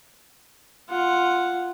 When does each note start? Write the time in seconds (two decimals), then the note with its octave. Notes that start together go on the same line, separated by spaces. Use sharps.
0.89 F4 F#5